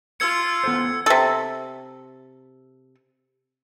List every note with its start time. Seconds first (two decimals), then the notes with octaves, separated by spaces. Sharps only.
0.20 F4 E6 G#6 C#7
0.64 B3 A4 C5
1.06 C3 A4